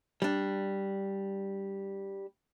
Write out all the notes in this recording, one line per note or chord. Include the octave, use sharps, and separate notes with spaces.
G3 D4